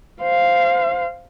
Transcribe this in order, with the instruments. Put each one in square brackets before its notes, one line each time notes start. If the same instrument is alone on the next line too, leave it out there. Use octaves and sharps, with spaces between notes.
[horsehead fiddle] C5 F5